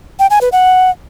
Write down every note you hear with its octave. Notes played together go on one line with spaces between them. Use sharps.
G5
G#5
B4
F#5